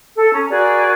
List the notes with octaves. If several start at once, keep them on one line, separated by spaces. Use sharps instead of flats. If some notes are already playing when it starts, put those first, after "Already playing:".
A4
C#4 A#5
F#4 G#4 A#4 D5